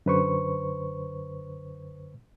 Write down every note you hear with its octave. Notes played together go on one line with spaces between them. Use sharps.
F#2 D3 B4 C5 C#6